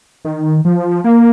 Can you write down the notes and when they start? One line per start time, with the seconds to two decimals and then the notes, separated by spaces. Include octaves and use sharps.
0.25 D#3
0.65 F3
1.04 A#3